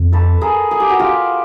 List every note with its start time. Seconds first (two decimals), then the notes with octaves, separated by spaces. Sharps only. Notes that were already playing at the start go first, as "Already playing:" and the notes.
Already playing: F2
0.12 A4 B4
0.41 G#4 A#4
0.71 G#4
0.80 G4
0.90 F#4
0.99 F4 G4